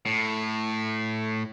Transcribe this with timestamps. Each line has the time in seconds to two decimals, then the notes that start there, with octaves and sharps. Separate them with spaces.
0.06 A2